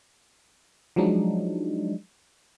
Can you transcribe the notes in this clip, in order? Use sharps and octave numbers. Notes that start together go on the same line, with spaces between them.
F3 F#3 G#3 D4 D#4